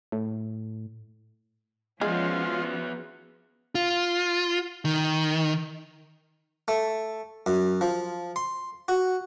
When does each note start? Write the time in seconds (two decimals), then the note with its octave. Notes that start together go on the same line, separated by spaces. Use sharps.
0.12 A2
2.01 F3 G#3 B3 C#4 F4 F#4 G#4
3.75 F4
4.85 D#3
6.68 A3
7.46 F#2
7.81 F3
8.36 C6
8.88 F#4